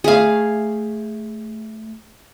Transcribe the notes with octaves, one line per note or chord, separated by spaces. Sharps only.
A3 G#4 C5 E5 F5